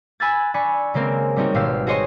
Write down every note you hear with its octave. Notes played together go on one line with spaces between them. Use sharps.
G#5 B5 E6 F#6 G#6 A6
D4 G#5 B5 C#6
C#3 G#3 A#3 C4 A#4
G3 C4 C#4 D#4 F#4
G#1 B2 G4 F5 E6 C7
F#4 G#4 C5 C#5 D#5 C6